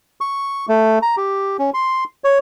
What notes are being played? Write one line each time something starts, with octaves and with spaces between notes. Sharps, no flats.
C#6
A3
A#5
G4
C#4
C6
C#5